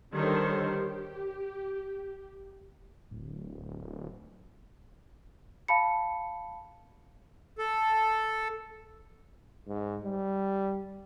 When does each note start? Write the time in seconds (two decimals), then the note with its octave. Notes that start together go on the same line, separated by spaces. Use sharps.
0.14 D3 D#3 G3 A4 C5 C#5
0.68 G4
3.11 D1
5.68 F5 A5 B5 C#7
7.58 A4
9.68 G#2
10.03 G3